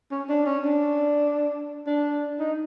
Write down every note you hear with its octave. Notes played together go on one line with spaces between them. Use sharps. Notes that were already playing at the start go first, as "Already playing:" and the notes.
C#4
D4
C#4
D4
D4
D#4